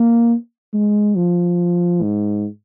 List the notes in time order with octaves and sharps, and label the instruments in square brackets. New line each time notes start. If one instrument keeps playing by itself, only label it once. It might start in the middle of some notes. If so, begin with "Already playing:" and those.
Already playing: [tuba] A#3
G#3
F3
G#2